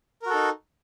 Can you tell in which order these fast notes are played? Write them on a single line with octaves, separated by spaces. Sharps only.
A#4 F#4 A4 D#4